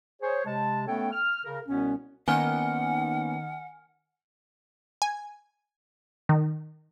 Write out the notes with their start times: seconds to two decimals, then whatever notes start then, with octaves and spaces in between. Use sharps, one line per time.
0.21 G#4 C5 C#5
0.45 C3 G#3 A5
0.86 A3 B3 C#4 A4 C#5 G5
1.11 F6
1.44 C#3 A#4
1.67 C2 B2 B3 C#4
2.28 D#3 A#3 B3 C#4 F#5 G#5 F6
5.02 G#5
6.29 D#3